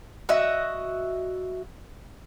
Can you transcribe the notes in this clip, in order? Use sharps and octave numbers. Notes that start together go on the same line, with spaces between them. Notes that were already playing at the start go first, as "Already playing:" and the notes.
F#4 D#5 E5